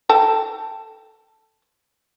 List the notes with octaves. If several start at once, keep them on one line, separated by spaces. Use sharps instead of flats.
A4 G5 A5